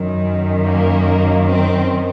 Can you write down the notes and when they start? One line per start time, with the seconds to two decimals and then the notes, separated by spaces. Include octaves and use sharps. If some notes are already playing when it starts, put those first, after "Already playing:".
Already playing: F#2 D#3
0.64 A#3
1.47 C4